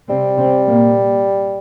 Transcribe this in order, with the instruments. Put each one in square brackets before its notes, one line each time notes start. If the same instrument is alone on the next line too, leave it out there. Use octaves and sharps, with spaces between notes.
[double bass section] C3 C4 [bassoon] G3
[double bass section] C3 C4
A#2 A#3